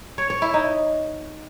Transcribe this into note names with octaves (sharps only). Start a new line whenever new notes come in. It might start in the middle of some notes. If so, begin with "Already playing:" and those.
C#5
C#5
E4
D#4